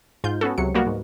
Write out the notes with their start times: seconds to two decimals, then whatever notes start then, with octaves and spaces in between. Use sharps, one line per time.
0.24 G#2 F4 G6
0.41 B3 C#4 F#4 A4
0.58 C#2 C3 F#3 C#7
0.75 G3 A#3 B3 F#4 A#4
0.87 G#2